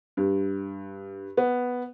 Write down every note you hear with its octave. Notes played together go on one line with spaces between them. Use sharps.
G2
B3